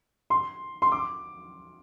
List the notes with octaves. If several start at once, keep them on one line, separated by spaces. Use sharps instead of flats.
C6
C6
D6